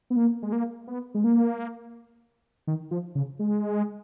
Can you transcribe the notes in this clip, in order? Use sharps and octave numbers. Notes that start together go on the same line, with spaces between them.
B3
A#3
G#3
A#3
B3
G#3
A#3
D#3
F3
C#3
G#3